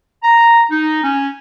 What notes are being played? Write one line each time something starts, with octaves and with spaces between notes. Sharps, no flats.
A#5
D#4
C#4